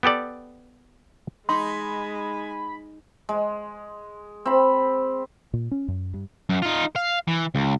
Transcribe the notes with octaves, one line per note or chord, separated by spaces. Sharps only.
B3 G4 A4 D5
G#3 D#4 G#5 B5 C6
G#3
C4 B5
A#2
C#4
F#2
G2
F#2
D#4 F4
F5
E3
C#2